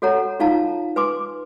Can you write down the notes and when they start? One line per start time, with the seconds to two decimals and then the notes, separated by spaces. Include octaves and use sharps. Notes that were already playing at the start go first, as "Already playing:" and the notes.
0.02 F#4 A4 C#5 F#5 A#5
0.40 D#4 F4 F5 A5 A#5
0.96 B4 G#5 C6 D6